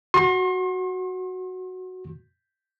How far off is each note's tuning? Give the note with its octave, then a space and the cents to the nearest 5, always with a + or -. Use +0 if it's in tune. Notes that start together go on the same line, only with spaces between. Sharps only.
F#4 +0 C6 +40